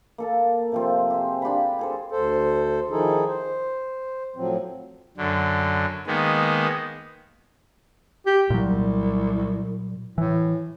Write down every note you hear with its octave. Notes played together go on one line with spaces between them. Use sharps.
A#3 A4 A5
C3 F3 C4
G4 G#4 C5
D4 G4 F5 B5
G#4 A4 C5
D2 A4 C5
D#3 F3 D#4 E4 G#4 A4
C5
A2 F3 F#3 C4
F#2 D3
D#3 G#3 A#3 B3
G4
C2 A#2 F#3
A2 E3